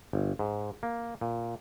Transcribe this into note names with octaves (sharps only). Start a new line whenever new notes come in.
G1
G#2
A#3
A#2